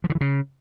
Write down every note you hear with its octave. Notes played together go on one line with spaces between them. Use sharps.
F3
D3
E3
C#3